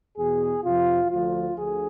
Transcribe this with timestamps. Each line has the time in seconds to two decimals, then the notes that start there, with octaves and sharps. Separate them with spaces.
0.16 E2 B2 G#4
0.64 F2 C3 F3 F4
1.10 D2 D3 F3 F4
1.56 D2 D3 F3 G#4